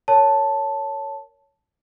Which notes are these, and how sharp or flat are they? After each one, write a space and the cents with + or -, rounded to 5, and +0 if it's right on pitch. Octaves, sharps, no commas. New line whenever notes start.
A#4 -10 C#5 +10 A5 +0